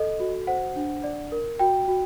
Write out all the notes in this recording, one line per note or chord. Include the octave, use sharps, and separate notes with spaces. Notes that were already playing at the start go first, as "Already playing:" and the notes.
Already playing: A4 D#5
F#4
C5 F#5
D4
D5
A#4
F#4 G5
F#4